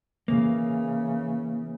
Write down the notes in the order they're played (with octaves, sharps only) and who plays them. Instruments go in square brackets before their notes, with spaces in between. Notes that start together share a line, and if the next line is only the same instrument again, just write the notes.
[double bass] C#3 E3 [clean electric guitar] A#3